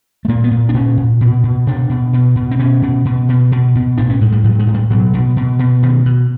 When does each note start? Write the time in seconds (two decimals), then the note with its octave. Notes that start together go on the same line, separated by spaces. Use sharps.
0.25 A3
0.28 A#2 A#3
0.44 B3
0.51 A#2
0.69 D4
0.74 A#2 C#4
0.97 A#2
1.21 B2
1.44 B2
1.67 B2 D4
1.90 B2
2.13 B2
2.36 B2
2.51 C4
2.59 B2 C#4
2.82 B2
3.05 B2
3.29 B2
3.52 B2
3.75 B2
3.97 A2 D4
4.10 C#4
4.21 A2 G#3
4.32 G3
4.44 A2 F#3
4.59 G#3
4.67 A2
4.74 G3
4.90 B2 F#3
5.14 B2
5.37 B2
5.59 B2
5.82 B2 D#3
6.06 B2